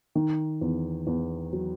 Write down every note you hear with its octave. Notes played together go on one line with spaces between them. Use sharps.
D#3
E2
E2
F#3